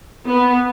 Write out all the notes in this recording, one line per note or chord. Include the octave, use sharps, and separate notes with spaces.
B3